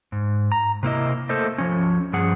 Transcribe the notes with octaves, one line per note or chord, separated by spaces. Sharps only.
G#2
A#5
C3 A#3 E4 D#5
A3 A#3 A4 C5 D#5
F3 C#4
G2 F3 G#4 F#5